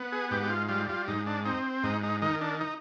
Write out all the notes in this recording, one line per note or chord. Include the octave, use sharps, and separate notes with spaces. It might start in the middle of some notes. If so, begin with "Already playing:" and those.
Already playing: B3
G#4
G#2 G4
G4
F4
G3 F4
F4
G#2 D#4
D4
C4 D#4
G#2 D#4
D#4
D#3 D#4
D4
D#4